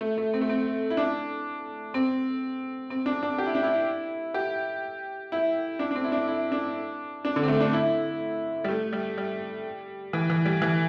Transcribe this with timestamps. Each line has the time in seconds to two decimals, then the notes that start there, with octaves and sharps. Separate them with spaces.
0.01 A3
0.18 A3
0.34 C4
0.41 A3
0.49 C4
0.90 E4
0.97 D4
1.94 C4
2.90 C4
3.06 D4
3.23 D4
3.38 G4
3.46 E4
3.55 D4
3.63 E4
4.34 G4
5.32 E4
5.79 D4
5.91 D4
5.95 C4
6.04 E4
6.12 D4
6.28 E4
6.52 D4
7.25 D4
7.36 D3
7.43 C4
7.48 A3
7.61 D4
7.73 E4
8.64 G3
8.68 A3
8.93 G3
9.18 G3
10.13 E3
10.30 E3
10.45 G3
10.62 E3